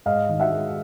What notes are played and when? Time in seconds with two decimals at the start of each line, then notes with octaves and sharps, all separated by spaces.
0.06 G#2 D#5 F5
0.29 D#3
0.40 E5 F#5
0.51 G#3